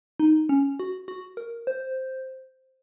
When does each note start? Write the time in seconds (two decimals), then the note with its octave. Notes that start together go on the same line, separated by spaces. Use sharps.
0.20 D#4
0.49 C#4
0.80 F#4
1.08 F#4
1.37 A#4
1.67 C5